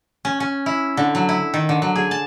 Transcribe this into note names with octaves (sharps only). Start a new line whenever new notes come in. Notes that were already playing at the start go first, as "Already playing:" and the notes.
C#4
C#4
E4
D3
F#3
E4
D#3
D3
F#3
G#4
A5